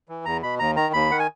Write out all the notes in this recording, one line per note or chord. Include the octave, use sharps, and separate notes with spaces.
E3
E2 A#5
B2 B5
D#2 A#5
D#3 A#5
D#2 B5
D#3 F#5
G#5